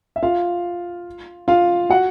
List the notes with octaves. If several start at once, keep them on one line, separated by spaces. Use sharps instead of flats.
E5
F4 F5
F4 F5
F#4 F#5